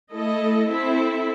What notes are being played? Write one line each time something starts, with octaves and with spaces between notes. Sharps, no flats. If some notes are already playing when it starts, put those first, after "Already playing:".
A3 E4 A4 D#5
C4 E4 A4 E5